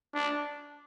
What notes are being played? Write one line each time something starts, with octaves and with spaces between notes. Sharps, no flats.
D4